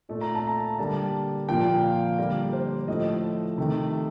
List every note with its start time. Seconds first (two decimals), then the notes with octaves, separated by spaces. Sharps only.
0.09 A#2 A3
0.21 A#5
0.35 A5
0.47 A#5
0.78 D3 G3 A#3 A5
1.48 A#2 F3 A#3 G5
1.83 F5
2.18 D3 G3 A#3 A#4
2.53 C5
2.88 A2 F3 A3 D#5
3.58 C3 D#3 A3